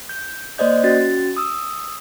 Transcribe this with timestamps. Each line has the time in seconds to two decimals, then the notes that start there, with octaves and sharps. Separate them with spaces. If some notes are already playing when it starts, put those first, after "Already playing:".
0.09 G6
0.58 A#3 C5 D5 D#5 G6
0.83 C#4 F#4 A6
1.37 D#6 E6